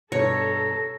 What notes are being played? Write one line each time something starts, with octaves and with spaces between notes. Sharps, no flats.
G2 B2 A4 C#5 A#5